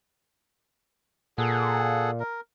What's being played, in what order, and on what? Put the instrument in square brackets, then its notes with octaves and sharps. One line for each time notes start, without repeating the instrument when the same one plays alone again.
[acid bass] A#2 [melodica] G#4 A4 F#5
[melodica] A#4